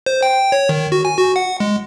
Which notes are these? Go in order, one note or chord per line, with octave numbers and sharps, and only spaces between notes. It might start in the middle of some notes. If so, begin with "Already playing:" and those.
C5
G5
C#5
D#3
F#4
G#5
F#4
F#5
G#3